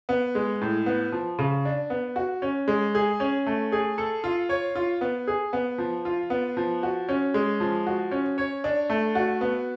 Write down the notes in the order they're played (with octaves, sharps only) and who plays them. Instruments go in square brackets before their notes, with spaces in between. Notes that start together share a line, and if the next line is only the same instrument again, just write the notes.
[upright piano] B3
G#3
A2
B3
F3
C#3
D4
B3
F#4
C#4
G#3
G#4
C#4
A3
G#4
A4
F4
C#5
F4
B3
G#4
B3
F3
F4
B3
F3
F#4
C#4
G#3
F3
F#4
C#4
C#5
D4
A3
F#4
B3